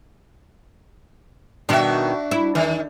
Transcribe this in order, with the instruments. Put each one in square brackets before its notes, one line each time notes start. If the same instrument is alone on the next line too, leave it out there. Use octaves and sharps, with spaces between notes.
[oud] B2 D#3 [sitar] D4 F#4 E5
[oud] E4
[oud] E2 [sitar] D#3